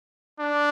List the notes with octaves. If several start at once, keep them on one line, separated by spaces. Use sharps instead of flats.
D4